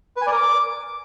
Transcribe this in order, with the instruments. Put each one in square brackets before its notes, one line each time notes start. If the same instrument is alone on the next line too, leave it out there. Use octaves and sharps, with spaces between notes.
[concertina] B4
G#5
D5
A#4
D6